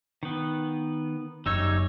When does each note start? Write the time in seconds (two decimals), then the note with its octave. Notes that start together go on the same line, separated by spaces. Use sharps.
0.23 D#3 B3
1.46 F#1 F#2 G3 D#4 C#5 E6